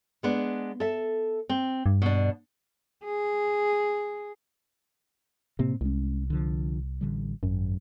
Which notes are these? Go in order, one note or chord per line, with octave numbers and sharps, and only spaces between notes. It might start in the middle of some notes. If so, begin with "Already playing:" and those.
G#3 B3 D4
A4 E5
C4
G2
B2 D4
G#4
A2 C3 A#3 C4
C2 G#3 C#4
D3 F3
A1 D3 G3
G#1 F#2